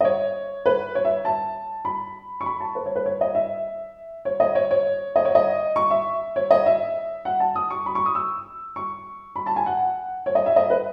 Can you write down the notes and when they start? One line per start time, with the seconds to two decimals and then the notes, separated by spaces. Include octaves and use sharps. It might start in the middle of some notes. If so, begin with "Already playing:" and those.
0.01 D#5
0.05 C#5
0.66 B4
0.95 C#5
1.05 E5
1.25 A5
1.85 B5
2.41 C#6
2.46 B5
2.60 A5
2.75 B4
2.86 C#5
2.96 B4
3.06 C#5
3.21 D#5
3.35 E5
4.25 C#5
4.40 D#5
4.55 C#5
4.71 C#5
5.16 D#5
5.25 C#5
5.35 D#5
5.76 C#6
5.90 E5
6.36 C#5
6.51 D#5
6.66 E5
7.25 F#5
7.40 A5
7.56 D#6
7.70 C#6
7.86 B5
7.95 C#6
8.06 D#6
8.15 E6
8.76 C#6
9.36 B5
9.46 A5
9.56 G#5
9.66 F#5
10.26 C#5
10.35 D#5
10.46 E5
10.56 D#5
10.70 B4